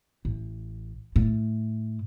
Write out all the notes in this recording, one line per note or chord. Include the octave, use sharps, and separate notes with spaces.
A1
A2